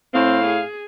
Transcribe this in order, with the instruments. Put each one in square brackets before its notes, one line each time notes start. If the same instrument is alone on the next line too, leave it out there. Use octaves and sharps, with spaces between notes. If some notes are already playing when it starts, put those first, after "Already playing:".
[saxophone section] A2 F5 [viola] C4
[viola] G#4